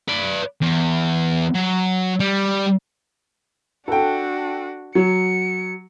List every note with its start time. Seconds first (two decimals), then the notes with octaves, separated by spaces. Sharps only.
0.08 B4 D5
0.62 E2
1.55 F#3
2.20 G3
3.88 D4 F#4 A4 G5
4.95 F#3 C#7